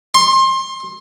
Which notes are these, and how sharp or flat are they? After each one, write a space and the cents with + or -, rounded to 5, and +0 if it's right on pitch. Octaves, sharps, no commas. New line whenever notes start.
C6 +25